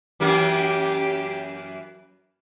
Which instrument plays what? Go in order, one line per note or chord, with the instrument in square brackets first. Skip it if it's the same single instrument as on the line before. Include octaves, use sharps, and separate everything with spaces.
[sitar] F#2 E3 A#3 [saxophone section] G4